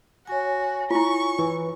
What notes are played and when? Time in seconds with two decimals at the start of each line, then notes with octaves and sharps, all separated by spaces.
0.27 F#4 C#5 G#5
0.91 E4 F4 C#6
1.39 E3